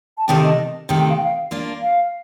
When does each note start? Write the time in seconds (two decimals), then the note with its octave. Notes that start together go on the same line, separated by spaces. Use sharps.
0.18 A5
0.28 C3 D#3 A3 D4 G5
0.43 D#5
0.89 C3 D#3 A3 G5
1.00 G5
1.10 F5
1.17 G5
1.24 F5
1.51 A#3 D4 F4
1.82 F5